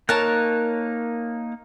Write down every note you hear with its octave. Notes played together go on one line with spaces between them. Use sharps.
A#3 D#4 A#4 C#5 A5 F#6